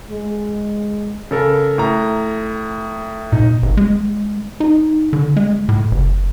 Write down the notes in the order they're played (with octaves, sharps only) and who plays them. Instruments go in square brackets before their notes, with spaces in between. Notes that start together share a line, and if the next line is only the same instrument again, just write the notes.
[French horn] G#3
[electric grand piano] C#3 A4 A#4
A2 A#5
[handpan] A#2 [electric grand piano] D#4
[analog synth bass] G#1
G#3
D#4
D3
G#3
A2
F#1